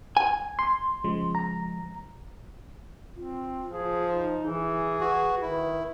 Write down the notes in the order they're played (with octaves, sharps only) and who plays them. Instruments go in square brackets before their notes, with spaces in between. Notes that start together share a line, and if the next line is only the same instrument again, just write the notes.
[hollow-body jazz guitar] G#5
[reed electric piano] C6
[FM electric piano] C#3 F3 G#3
[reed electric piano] A#5
[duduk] C4 [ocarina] F4
[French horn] F3 [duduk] G#4
[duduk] D#4
[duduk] E3 [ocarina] E4 [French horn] G#4
[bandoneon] F#4 [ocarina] B4
[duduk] D#3 [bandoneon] E4